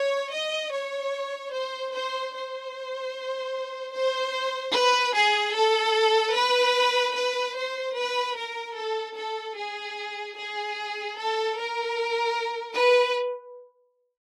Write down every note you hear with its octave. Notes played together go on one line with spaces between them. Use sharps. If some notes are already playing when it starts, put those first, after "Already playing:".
Already playing: C#5
D#5
C#5
C5
C5
C5
C5
B4
G#4
A4
B4
B4
C5
B4
A#4
A4
A4
G#4
G#4
A4
A#4
B4